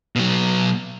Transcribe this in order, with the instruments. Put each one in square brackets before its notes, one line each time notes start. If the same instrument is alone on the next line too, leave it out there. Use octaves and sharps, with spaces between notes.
[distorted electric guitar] B2 F#3